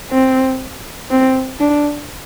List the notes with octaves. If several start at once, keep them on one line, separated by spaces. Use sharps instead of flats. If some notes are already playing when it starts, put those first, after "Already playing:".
C4
C4
D4